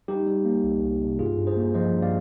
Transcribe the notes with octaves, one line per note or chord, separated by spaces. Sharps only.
G3 D#4 G4
G3
A#3
C2
C2
C3
G2 F4 G#4
G2
G#4 C5
A#3
F3 C5 D#5
G2
D5 F5